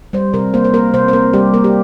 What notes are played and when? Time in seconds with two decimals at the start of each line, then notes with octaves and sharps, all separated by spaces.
0.13 G3 C5
0.33 C3 A#4
0.54 A#3 C5
0.64 C5
0.74 A#3 A#4
0.94 C3 C5
1.08 C5
1.13 A#3 A#4
1.33 G3 G4
1.54 A#3 A#4
1.64 G4